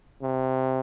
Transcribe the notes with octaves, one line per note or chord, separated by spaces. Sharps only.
C3